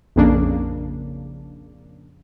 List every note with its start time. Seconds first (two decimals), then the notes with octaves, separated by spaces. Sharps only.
0.16 A#1 F2 C#3 A#3 D4